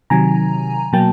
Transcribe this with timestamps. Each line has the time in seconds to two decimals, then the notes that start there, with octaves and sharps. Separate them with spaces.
0.10 C3 D#3 F#3 G#5 A#5
0.93 B2 F#3 A#3 G5 A5